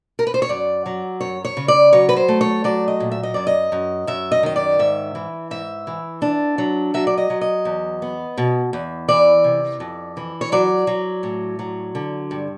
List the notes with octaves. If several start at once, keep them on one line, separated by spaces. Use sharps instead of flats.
A#4
B4
C5
C#5
F#2 D5
F#3
F#2 C#5
C#5
C#3
D5
F#3 C#5
B4
C5
A3
C#5
F#3 D5
D#5
A#2
E5
D#5
F#2 D5
D#5
F#2
F#2 E5
D#5
D#3 D#5
D5
G#2 E5
E3
G#2 E5
E3
D4
F#3
F#3 E5
D5
D#5
F#3
D#5
E2
B3
B2
E2
E3 D5
C3
F2
E3
C#5
F#3 D5
F#3
A2
F#3
D3
G2